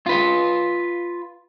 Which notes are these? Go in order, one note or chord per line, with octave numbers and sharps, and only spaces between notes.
F4 B4